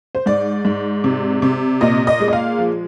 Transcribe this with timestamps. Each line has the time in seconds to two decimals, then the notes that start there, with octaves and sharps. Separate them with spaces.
0.15 C5
0.26 G#2 D5
0.65 G#2
1.04 C3
1.42 C3
1.81 A#2 D#5
2.07 D#5
2.20 G#3
2.28 D#5
2.33 F5
2.58 F3